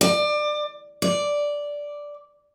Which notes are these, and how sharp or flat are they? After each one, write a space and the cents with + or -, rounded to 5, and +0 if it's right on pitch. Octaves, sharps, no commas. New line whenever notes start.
D5 +25
D5 -5